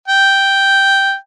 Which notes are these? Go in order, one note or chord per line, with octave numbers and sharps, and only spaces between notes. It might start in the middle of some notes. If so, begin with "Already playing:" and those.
G5